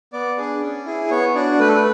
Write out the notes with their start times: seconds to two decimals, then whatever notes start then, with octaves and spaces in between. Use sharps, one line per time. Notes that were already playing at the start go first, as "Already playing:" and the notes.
0.13 B3 D5
0.38 D4 G#4
0.62 C#4
0.86 E4 G#4
1.10 B3 C#5
1.35 D4 F#4
1.59 A3 B4
1.68 A4
1.76 B4